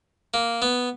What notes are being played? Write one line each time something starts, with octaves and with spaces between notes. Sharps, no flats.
A#3
B3